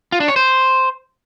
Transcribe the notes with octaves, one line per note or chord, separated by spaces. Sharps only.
F4
D4
C#5
C5